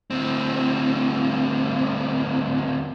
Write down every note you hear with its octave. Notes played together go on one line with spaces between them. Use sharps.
D2 C4